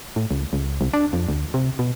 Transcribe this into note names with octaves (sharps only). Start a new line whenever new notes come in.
A2
C#2
C#2
C2
D4
F2
D2
C3
B2